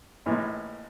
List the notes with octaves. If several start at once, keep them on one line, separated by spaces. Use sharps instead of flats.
A#1 A2 E3 G#3